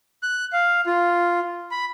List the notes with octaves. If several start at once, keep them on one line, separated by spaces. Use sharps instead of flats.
F#6
F5
F4
B5